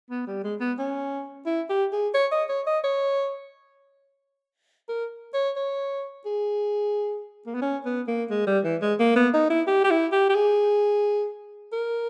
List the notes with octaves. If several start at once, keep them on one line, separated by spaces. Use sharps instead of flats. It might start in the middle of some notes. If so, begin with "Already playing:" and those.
B3
G3
G#3
B3
C#4
E4
G4
G#4
C#5
D#5
C#5
D#5
C#5
A#4
C#5
C#5
G#4
A#3
B3
C#4
B3
A#3
G#3
G3
E3
G#3
A#3
B3
D#4
E4
G4
G4
E4
G4
G4
G#4
A#4